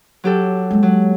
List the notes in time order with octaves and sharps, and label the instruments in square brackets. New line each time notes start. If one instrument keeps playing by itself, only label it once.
[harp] F#3 G4 A4
[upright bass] G#3 A#3
[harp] F#3